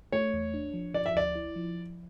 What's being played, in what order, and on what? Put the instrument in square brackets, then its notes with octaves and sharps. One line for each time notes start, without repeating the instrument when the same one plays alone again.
[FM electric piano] A3 [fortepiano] C#5
[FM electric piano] E2
D4
F3
[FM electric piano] F3 [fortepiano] D5
[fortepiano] E5
[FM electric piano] D2 [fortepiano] D5
[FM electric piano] E4
F3